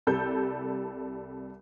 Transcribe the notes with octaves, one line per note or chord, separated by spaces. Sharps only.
C2 G3 A4 G6